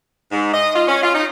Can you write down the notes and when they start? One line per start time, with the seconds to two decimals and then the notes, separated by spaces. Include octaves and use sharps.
0.31 G#2
0.53 D#5
0.75 F4
0.87 C#4
1.03 F4
1.14 D#4